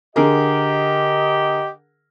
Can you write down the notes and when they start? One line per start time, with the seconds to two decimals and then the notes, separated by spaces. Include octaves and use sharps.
0.16 D3 G4 G#4 A#4 D#5